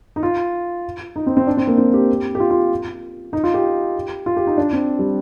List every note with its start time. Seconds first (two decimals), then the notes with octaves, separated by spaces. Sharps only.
0.16 D#4
0.23 F4
1.16 D#4
1.26 C4
1.37 C4
1.47 D4
1.57 C4
1.67 A#3
1.78 C4
1.94 G4
2.35 G4
2.40 F4
2.50 F4
3.33 D#4
3.44 F4
3.54 G4
4.26 F4
4.37 G4
4.47 D#4
4.57 D4
4.73 C4
4.99 G3